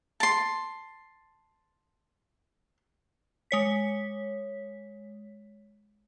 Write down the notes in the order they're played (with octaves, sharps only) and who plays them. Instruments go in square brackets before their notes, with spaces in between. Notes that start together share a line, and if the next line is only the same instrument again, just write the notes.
[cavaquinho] A5 C6
[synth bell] G#3 C#5 B6